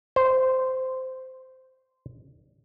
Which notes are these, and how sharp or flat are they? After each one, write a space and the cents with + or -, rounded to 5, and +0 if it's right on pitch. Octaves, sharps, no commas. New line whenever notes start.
C5 -10